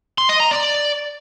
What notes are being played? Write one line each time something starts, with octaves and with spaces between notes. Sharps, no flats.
C6
D#5
A#5
D5